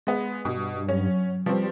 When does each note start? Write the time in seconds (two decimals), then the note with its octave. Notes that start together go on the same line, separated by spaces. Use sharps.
0.07 G#3 B3
0.45 G2 B2
0.89 F#3 C#4
1.46 F3 G3 C4 B4 C#6